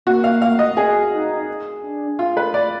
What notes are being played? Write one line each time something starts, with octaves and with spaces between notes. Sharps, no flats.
A#3 F#4
F5
F5
D#5
G#4
D#4
D4
F4
B4
D5